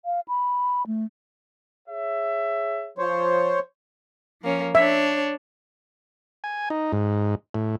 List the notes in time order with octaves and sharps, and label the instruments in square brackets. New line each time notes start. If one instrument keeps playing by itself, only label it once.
[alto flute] F5
B5
A3
[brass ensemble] G#4 C#5 E5
[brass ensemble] F3 [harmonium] C5 C#5
[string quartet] F3 A#3 C#4
[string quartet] D4 C#5 [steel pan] E5
[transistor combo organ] G#5
D#4
G#2
A2